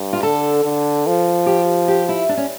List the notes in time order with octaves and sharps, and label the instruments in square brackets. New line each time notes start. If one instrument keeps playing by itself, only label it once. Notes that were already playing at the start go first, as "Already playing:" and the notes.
Already playing: [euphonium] G2
[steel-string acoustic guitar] F4
[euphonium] D3 [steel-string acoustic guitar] A4
[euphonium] D3
F3
[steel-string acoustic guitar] G4
G4
E4
D4
C#4